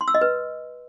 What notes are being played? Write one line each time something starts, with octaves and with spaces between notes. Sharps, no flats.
C6
E6
D#5
B4